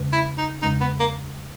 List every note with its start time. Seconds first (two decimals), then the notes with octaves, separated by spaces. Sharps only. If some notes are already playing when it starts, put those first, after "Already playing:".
Already playing: E2 C#3 G#3 C#4
0.13 E4
0.38 D#4
0.62 E2 C#3 G#3 C#4 D#4
0.80 B3
1.00 A#3